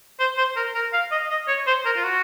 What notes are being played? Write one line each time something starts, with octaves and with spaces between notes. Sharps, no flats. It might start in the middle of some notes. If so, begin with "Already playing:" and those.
C5
C5
A#4
A#4
F5
D#5
D#5
C#5
C5
A#4
F4
F#4